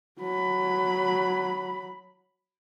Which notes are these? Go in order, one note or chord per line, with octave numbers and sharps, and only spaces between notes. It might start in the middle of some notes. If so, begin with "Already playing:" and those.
F#3 B5